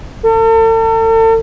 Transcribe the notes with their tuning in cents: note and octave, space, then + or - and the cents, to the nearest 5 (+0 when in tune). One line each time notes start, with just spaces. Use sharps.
A4 +40